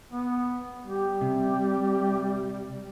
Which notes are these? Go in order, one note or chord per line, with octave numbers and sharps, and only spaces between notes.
B3
G3 G4
C3